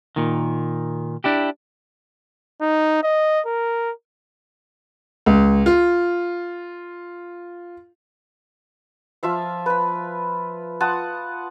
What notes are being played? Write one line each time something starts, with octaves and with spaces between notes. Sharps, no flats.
A#2 D#3
D4 E4 G4
D#4
D#5
A#4
C#2
F4
F3 F4 E5 F5
B4 B5
F4 F#5 A5 D#6